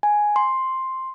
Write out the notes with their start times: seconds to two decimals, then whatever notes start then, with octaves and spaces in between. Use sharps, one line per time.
0.03 G#5
0.36 C6